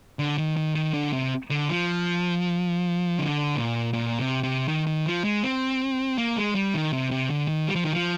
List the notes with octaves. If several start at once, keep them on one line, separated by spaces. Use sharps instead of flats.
D3
D#3
D#3
D#3
D3
C3
D3
F3
D3
A#2
A#2
C3
C3
D#3
D#3
F3
G#3
C4
A#3
G#3
G3
D#3
C3
C3
D3
D#3
G3
F3
D#3
F3